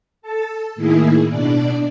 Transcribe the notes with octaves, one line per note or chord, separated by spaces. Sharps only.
A4 A5
A2 D#3 A#3 E4 G#4
B2 D4 D5